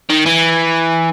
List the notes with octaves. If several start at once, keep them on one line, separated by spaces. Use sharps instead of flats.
D#3
E3